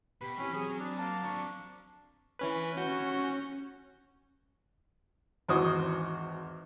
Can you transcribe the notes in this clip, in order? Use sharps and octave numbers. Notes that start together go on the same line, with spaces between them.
B2 G4 B5
E3 F3 C4 C#4
F#3 C4 G#4
D4
A#3 A5
F#3 C4 D4 C#6
E3 C#4 B4
C#4 F#4 G6
G#1 E2 F#4 C5 D#6